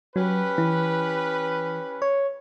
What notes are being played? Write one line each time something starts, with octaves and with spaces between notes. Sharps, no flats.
F#3 C#4 G4 B4
E3
C#5